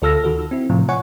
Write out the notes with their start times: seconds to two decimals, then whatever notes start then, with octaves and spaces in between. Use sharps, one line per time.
0.02 D2 F4 A4 E6 F6 A#6
0.24 D#3 F#4 A4
0.39 E6
0.51 C4 E4
0.70 A2 C3 F3
0.89 C#5 F#5 G#5 C#6